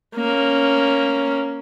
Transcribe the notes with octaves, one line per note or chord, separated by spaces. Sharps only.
A#3 C#4